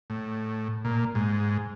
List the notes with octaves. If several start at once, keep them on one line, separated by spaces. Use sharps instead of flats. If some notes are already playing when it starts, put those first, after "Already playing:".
A2
A#2
G#2